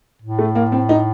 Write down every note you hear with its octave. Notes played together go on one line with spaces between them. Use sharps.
A2
A3
A#3
C4
D#4